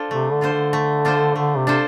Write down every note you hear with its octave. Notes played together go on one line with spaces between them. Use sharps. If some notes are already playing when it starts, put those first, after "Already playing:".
Already playing: D4 F4 A4 C5
C3 A3
D3
D4 F4 A4 C5
D3
A3
D4 F4 A4 C5
D3 A3
C3
D4 F4 A4 C5